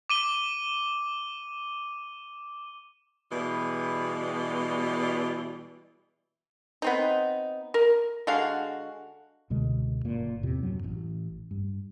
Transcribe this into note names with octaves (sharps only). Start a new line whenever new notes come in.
D6 D#7 G7
B2 E3 G3 G#3
B3 C4 D#4
A#4
D3 G#3 F#4 F5
C#2 B2 D3 G#3
F#1 A#2
E2 A2 C3
F#2 F#3
A1
G2